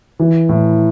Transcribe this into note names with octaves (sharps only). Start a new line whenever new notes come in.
E3
A2